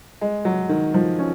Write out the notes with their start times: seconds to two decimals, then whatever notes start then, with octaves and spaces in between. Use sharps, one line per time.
0.21 G#3
0.45 F#3
0.69 D#3
0.94 F3
1.19 C#4